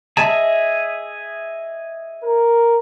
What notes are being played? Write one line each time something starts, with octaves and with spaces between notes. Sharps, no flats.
G#4 D#5 E5 A5
A#4